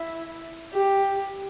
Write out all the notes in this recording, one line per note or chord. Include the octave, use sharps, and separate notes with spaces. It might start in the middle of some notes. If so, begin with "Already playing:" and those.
Already playing: E4
G4